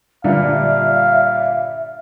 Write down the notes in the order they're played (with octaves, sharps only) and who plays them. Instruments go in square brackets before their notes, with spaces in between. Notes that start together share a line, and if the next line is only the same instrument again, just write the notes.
[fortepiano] G2 A#2 D3 [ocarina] E5 [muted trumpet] F5